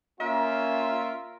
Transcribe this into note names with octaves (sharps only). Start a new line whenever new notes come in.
A#3 C#4 F4 A#4 E5